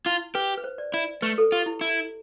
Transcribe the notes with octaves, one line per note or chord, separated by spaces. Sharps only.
E4 F4
G4 B4
B4
C5
D5
E4 D5
A3 B4
A4
F4 G4
E4
E4